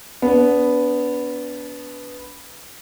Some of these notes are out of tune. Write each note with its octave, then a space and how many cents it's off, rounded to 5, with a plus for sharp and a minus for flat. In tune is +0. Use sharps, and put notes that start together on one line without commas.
B3 +0 D4 -30